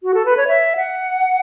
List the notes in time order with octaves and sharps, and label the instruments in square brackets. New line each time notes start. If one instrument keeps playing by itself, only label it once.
[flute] F#4
A4
B4
C#5
E5
F#5